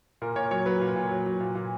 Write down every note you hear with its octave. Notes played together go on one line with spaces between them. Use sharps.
A#2 A#4
A#2 C#5
F#3 C#5
F#3 B4
A#2
A#2
F#3
F#3
A#2
A#2